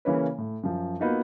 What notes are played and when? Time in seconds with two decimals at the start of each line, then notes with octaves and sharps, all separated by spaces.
0.05 C#3 E3 A#3 C#4 B4
0.38 A2
0.63 F#2 F3
1.00 A#3 B3 D#4 F4 F#4